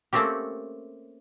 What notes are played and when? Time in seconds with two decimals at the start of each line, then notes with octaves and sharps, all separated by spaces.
0.13 A3 A#3 C4 C#4 G4